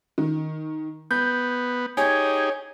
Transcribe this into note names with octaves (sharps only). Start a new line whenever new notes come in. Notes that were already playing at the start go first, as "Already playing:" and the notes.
D#3
B3 G6
D#4 G4 G#4 C#5 G#5 G#6